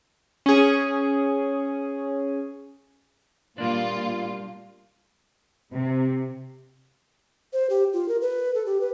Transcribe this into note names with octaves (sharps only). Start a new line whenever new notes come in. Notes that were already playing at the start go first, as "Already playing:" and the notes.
C#4 G#4
A#2 G3 A#3 D4 F4
C3
C5
G4
F4
A#4
B4
A4
G4
B4